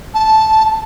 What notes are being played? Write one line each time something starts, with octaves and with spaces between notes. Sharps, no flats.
A5